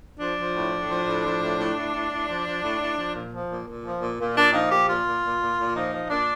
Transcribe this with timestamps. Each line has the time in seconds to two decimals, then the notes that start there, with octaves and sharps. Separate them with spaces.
0.19 F3 D4
0.36 F3
0.54 A2
0.72 A2
0.89 F3
1.06 A2
1.24 F3
1.41 A2
1.58 A2
1.76 A2
1.93 A2
2.10 A2
2.27 F3
2.45 F3
2.62 A2
2.80 A2
2.97 F3
3.14 A#2
3.32 F3
3.49 A#2
3.67 A#2
3.84 F3
4.01 A#2
4.19 A#2
4.36 A#2 D4
4.53 F3 D#4
4.70 A#2 G4
4.88 A#2 F4
5.05 A#2
5.23 A#2
5.40 A#2
5.58 A#2
5.74 F3 D#4
5.93 F3
6.09 A#2 D4